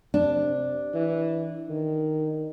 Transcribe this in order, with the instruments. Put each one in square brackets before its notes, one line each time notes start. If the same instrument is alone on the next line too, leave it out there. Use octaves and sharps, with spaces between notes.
[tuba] C3 [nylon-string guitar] D4
[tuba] E3
D#3